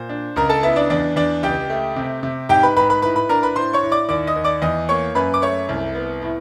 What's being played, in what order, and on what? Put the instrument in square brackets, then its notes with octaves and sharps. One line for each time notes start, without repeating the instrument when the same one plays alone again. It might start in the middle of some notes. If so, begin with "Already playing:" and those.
Already playing: [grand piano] A#2 C5
D4
C#2 A#4 A#5
A4 A5
B3 E4 E5
D4 D5
E2 D4 D5
E2 D4 D5
C#2 G4 G5
A3
C3
C3
G#2 G4 G5
B4 B5
G#2 B4 B5
B4 B5
A2 B4 B5
B4 B5
D4 A#4 A#5
B4 B5
A2 C5 C6
C#5 C#6
A2
D5 D6
D#2 D5 D6
D#5 D#6
D#2
D5 D6
E2 D#5 D#6
A#3 C#5 C#6
F#2 B4 B5
D6
A3 C#5 C#6
C2
B3
A2